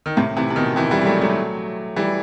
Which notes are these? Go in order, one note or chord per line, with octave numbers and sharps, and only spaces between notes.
D#3
A2 C3
C3 E3
C3
B2 D#3
C3 E3
E3 G3
G3
F#3 A3
F#3 A3
E3 G3